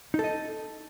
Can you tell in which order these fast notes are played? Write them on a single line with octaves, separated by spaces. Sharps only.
D#4 A4 D#5